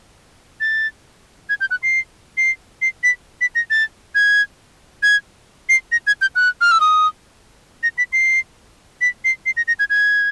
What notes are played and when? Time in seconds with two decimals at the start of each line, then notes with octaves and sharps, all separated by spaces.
0.60 A6
1.49 G#6
1.60 G6
1.71 F#6
1.83 C7
2.37 C7
2.82 C7
3.03 B6
3.41 B6
3.55 A#6
3.70 A6
4.15 G#6
5.03 G#6
5.69 C7
5.92 A#6
6.07 G#6
6.21 G6
6.36 F#6
6.61 F6
6.71 E6
6.80 D#6
7.83 A#6
7.98 B6
8.13 C7
9.01 B6
9.25 C7
9.46 C7
9.57 A#6
9.68 A#6
9.79 G#6
9.90 G#6